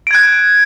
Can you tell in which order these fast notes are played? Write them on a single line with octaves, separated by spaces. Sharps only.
D7 G#6 F#6